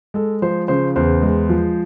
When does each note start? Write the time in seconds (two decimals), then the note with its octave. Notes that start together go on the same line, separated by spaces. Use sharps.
0.14 G#3 A4
0.42 F3 C5
0.68 C#3 C5
0.96 E2 C5
1.22 G#3
1.50 F3